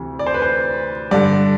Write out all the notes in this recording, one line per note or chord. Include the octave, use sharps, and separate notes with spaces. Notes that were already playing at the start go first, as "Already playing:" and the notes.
Already playing: D2 C3 E3
D5
C5
B4
C5
G2 D3 D5